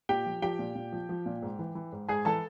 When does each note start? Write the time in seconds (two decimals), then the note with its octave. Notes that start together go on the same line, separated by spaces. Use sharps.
0.09 A#2 G4 G5
0.26 F3
0.42 F3 G4 G5
0.59 A#2
0.75 A#2
0.92 F3
1.09 F3
1.26 A#2
1.42 G#2
1.59 E3
1.75 E3
1.92 G#2
2.09 G#2 G#4 G#5
2.25 E3 A4 A5